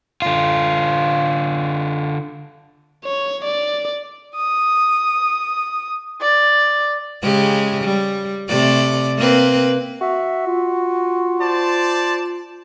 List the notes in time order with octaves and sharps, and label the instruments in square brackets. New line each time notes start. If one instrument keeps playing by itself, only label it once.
[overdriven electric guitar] D3 F4
[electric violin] C#5
D5
[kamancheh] D#6
D5
[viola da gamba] C#3 G#3 G4
G3
C3 A3 D5
A#3 C4 B4
[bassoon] F#4 [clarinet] E5
[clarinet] F4
[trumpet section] C5 D5 A5